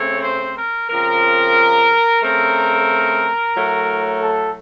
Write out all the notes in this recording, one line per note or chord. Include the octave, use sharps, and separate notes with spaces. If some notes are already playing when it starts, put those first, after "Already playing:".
Already playing: C#3 A3 C4 C#5
C5
A#4
C#3 F3 C4 A#4
C#3 A3 C4 A#4
A2 F#3 A3
A4